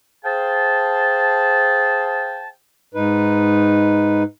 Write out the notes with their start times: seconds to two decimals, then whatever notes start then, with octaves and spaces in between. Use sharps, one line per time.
0.24 G#4 C5 F5 G5 A5
2.94 G#2 D#4 B4